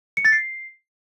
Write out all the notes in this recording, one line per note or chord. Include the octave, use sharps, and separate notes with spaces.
C#7
A6
C7